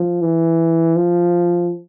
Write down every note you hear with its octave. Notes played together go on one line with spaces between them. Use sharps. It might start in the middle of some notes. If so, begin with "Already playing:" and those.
Already playing: F3
E3
F3